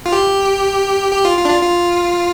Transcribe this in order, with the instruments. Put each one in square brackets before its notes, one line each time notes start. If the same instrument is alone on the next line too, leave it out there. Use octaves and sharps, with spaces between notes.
[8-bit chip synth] F4
G4
G4
F4
F4
D4
F4
F4